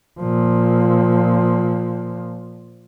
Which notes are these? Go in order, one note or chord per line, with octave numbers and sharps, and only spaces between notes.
A#2 F3